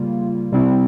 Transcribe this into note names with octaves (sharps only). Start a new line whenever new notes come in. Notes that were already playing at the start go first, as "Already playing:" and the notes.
Already playing: C#3 G3 A#3 F4
C3 G3 C4 E4